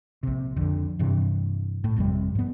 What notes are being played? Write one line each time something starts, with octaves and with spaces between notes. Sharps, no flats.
A#1 C3
F2 D3
G2 C3 E3
A2
G#1 F2 C3 G3
G#2 B3